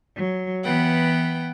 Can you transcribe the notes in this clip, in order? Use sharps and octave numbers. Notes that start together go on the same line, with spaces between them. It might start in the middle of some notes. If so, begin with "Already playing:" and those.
F#3
E3 B3 B4 F#5 G5